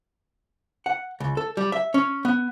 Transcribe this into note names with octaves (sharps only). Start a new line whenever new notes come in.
F#5
C#2
A4
G3
E5
C#4
B3